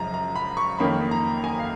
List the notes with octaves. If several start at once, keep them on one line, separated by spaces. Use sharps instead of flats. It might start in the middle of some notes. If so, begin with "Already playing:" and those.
Already playing: F#2 C#3 F3 G#3 A#5
A#5
B5
C#6
F2 D#3 A#3 C#4 B5
A#5
G#5
F5